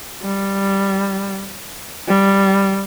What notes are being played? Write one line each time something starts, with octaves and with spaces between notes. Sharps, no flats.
G3
G3